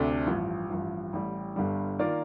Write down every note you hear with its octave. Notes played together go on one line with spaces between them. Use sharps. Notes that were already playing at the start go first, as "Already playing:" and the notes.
Already playing: D2 C3 A3 D4
A1 G2 F3
A1 G2 F3
A1 A2 G3
G1 G2 D3 G3
D#3 A#3 F4 A#4 D5